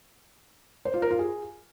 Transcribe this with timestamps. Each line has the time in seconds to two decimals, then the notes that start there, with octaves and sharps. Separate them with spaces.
0.85 C5
0.94 F4
1.02 A#4
1.11 F4
1.19 G#4